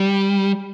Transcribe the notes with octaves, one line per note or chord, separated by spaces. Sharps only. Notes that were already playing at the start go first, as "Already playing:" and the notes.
Already playing: G3